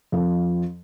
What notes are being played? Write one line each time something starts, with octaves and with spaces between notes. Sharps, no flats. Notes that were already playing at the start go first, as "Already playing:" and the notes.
F2 F3